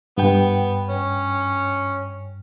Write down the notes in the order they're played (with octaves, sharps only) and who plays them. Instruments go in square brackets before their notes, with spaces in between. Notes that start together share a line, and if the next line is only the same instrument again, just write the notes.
[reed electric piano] G2 G5 [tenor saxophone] B3
[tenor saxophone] C#4